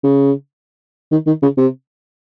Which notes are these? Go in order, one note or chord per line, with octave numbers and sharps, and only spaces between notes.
C#3
D#3
D#3
C#3
C3